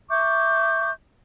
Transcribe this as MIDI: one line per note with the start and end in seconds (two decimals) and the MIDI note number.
0.09 0.90 76
0.09 0.90 85
0.09 0.90 86
0.09 0.90 91